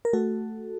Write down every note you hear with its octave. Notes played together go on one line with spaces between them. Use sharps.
A#4
A3 F#4 A4